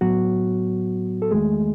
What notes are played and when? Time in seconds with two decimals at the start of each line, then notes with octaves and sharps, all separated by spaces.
0.01 A2 F#3 B3 F#4
1.22 A4
1.31 E2 D#3 G#3 A3 G#4